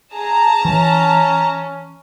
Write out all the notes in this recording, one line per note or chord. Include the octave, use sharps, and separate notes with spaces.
G#4 A5 A#5
E3 C#4